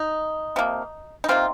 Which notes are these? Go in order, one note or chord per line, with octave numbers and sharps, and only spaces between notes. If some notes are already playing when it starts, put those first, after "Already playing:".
Already playing: D#4
C3 F3 A#3
D#4
C3 D#3 A#3 C4 F4